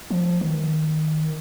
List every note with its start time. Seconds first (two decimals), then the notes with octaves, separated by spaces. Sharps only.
0.11 F3
0.41 D#3